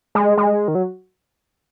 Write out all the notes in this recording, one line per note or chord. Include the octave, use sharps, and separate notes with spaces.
G#3
G#3
D#3
F#3